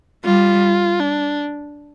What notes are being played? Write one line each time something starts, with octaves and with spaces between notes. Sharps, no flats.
G3 F4
D4